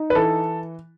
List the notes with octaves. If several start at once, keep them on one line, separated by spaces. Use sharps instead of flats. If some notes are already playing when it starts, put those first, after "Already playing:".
Already playing: D#4
B4
E3 A4